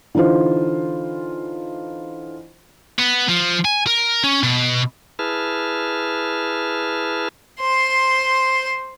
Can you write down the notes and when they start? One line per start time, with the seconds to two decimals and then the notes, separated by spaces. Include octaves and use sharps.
0.15 D3 E3 D#4 F4 C5
2.99 B3
3.29 F3
3.65 G#5
3.87 A#4
4.24 C#4
4.43 B2
5.19 E4 G#4 B4 A5 F6
7.60 C5 C6